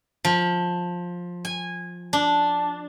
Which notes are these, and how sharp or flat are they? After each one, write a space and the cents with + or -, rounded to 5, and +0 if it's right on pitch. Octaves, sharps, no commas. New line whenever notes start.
F3 +15
G#5 -15
D4 -5